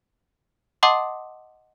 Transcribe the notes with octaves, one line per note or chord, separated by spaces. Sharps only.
D#5 F#5 A5 C6 D6 D#6